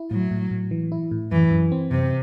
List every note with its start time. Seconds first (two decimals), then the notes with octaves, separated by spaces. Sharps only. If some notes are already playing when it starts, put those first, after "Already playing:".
Already playing: E4
0.11 A2 F#3
0.31 A2
0.51 A2
0.71 E3
0.92 E4
1.11 A2
1.32 F#2 E3
1.51 F#2
1.72 C4
1.91 F#2 C3